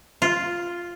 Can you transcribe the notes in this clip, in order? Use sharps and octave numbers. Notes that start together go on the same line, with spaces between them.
F4